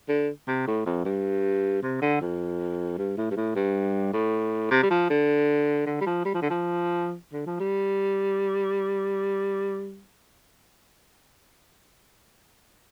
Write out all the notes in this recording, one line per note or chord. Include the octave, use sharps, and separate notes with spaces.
D3
C3
A2
F2
G2
C3
D3
F2
G2
A2
G2
A2
G2
A2
C3
G3
F3
D3
D3
G3
F3
G3
F3
D3
F3
D3
F3
G3